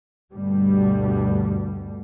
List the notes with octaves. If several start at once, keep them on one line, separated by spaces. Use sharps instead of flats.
D2 G2 B2 G3